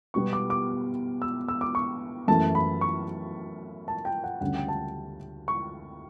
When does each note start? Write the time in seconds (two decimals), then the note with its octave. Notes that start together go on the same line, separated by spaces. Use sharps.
0.14 B2 G3 B3 C#6
0.33 D6
0.50 D6
1.22 E6
1.48 E6
1.61 D6
1.75 C#6
2.28 F#2 E3 A3 A5
2.55 B5
2.81 C#6
3.88 A5
4.05 G5
4.24 F#5
4.41 D2 C#3 G3 C#4 F#5
4.55 G5
4.68 A5
5.48 C#6